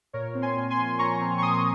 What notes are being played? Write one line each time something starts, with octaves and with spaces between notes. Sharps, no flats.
A#2 A#4 C#5
C4
G#5 C6
A#2
G#5 C6
F3
A#2 A#5 C#6
C4
C#6
A#2 C6 D#6